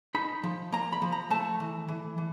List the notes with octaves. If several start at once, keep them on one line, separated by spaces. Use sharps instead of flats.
D#4 B5
F3
A#3 A#5
B5
F3
A#5
A3 A5
E3
E3
E3